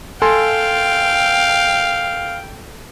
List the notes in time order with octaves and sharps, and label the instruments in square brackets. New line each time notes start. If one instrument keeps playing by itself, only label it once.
[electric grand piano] A4 G#5 C6 [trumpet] F5 [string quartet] G5